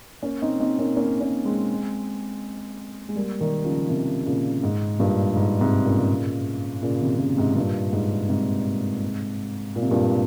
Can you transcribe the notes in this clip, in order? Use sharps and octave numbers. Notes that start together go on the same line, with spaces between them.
A#3 C#4
C4 D#4
C4 D#4
A#3 C#4
A#3 C#4
A#3 C#4
G#3 C4
G#3
G3 A#3
D#3 G3
C#3 F3
C3 D#3
A#2 C#3
G#2
G2 A#2
G#2
G#2 C3
A#2 C#3
A#2 C#3
C3 D#3
C3
A#2 C#3
G#2 C3
G2 A#2
G#2
G#2 C3
A#2
C3
G2 A#2